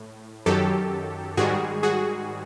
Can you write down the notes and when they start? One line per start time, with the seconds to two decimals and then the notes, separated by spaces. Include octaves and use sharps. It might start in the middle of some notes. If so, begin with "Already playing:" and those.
Already playing: A2
0.46 F#2 D#3 F#3 G4 A4
1.37 G#2 D#3 G3 F#4 G#4
1.83 F#4 G#4